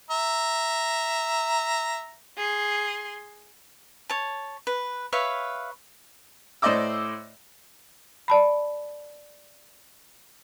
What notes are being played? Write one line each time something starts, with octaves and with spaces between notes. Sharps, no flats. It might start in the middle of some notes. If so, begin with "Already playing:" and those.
E5 A#5
G#4 C6
C#5 A5
B4
B4 C#5 E5 F5
A2 C5 D5 D#5 D6 E6
D5 A5 B5